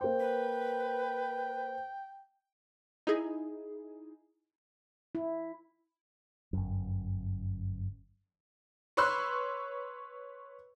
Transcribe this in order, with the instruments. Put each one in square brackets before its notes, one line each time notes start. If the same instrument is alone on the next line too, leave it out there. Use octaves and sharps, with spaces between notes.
[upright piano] A#3 C5 [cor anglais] G5
[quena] B4
[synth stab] D#4 E4 G#4
[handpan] E4
[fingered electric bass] G1 F#2
[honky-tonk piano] B4 C#5 B5 C6 E6 F#6